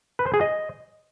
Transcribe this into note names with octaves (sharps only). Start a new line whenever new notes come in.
B4
C5
G#4
D#5